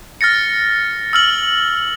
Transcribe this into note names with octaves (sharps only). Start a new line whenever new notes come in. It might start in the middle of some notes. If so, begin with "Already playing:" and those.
F6 A6 A#6 C#7
E6 F6 F#7